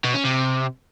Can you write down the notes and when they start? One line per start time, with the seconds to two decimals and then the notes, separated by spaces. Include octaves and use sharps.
0.04 B2
0.14 C#4
0.24 C3